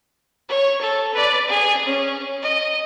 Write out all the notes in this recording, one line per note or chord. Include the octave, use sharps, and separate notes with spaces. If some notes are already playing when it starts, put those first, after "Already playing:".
C#5
A4
B4 D5
G#4
C#4
D#5